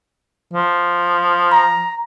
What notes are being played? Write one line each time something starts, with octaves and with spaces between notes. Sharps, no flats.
F3
A#5